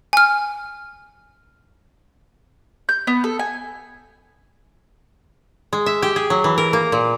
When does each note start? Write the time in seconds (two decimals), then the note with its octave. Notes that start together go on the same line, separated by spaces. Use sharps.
0.13 G#5 F6
2.89 G6
3.07 B3
3.24 A4
3.39 G#5
5.73 G#3
5.86 E5
6.02 G4
6.16 G#4
6.30 F#3
6.44 E3
6.58 A#4
6.73 A#3
6.92 A#2